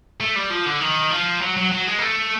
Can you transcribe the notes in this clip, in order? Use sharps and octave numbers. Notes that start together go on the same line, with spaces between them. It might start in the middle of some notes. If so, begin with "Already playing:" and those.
A3
G3
F3
D3
D#3
F3
F#3
F#3
F#3
G#3
A#3
A3